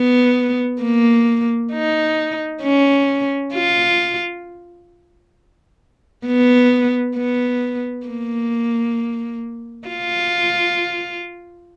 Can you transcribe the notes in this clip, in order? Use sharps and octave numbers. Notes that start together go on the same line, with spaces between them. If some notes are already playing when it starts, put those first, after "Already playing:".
Already playing: B3
A#3
D#4
C#4
F4
B3
B3
A#3
F4